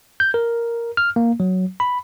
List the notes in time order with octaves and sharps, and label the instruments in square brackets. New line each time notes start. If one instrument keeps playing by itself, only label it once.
[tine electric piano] G6
A#4
F6
A#3
F#3
B5